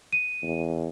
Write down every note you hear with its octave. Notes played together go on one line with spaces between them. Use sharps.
D#7
E2